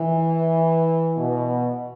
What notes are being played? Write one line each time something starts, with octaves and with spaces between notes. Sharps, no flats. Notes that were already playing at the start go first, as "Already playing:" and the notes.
Already playing: E3
B2